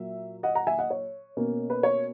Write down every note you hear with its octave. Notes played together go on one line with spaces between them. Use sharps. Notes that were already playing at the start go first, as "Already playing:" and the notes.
Already playing: A#2 F#3 A#3 E5
D#5 F#5
F#5 A#5
E5 G#5
D#5 F#5
C#5
B2 A#3 C#4
B4
C#5